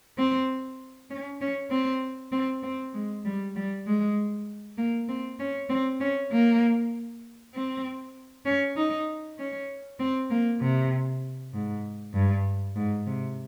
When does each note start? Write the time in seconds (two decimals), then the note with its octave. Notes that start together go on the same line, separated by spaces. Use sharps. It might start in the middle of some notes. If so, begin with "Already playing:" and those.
0.18 C4
1.10 C#4
1.41 C#4
1.71 C4
2.32 C4
2.63 C4
2.93 G#3
3.25 G3
3.56 G3
3.86 G#3
4.78 A#3
5.09 C4
5.39 C#4
5.69 C4
6.00 C#4
6.32 A#3
7.54 C4
8.46 C#4
8.76 D#4
9.38 C#4
10.00 C4
10.30 A#3
10.61 C3
11.53 G#2
12.14 G2
12.75 G#2
13.07 C3